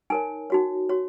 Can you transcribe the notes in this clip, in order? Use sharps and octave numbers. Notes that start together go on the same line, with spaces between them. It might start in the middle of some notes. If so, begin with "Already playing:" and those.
D#4 A#4 C#5 G#5
D#4 F#4 C#5
F#4 C#5